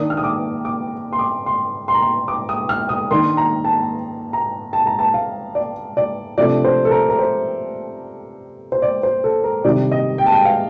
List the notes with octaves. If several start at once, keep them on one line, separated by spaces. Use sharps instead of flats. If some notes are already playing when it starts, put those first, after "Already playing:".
Already playing: D#3 A#3 D4 D#6
F6
D#6
D6
D6
C6
D6
C6
C6
A#5
C6
D6
D#6
F6
D#6
D#3 A#3 D4 C6
A#5
A5
A#5
A5
A#5
A5
F5
D5
D5
C3 F3 A3 D4 D5
C5
A4
A#4
A#4
C5
C5
D5
C5
A4
A#4
C3 D#3 G3 D4 D5
D#5
G5
A5
G5
F5